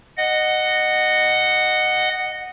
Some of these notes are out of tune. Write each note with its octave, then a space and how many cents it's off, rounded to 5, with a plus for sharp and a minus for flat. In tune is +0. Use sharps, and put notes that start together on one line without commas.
D#5 -15 F#5 +0